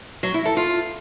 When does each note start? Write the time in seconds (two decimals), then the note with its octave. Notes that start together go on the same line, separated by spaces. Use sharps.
0.23 F#3
0.34 E4
0.45 A4
0.57 F4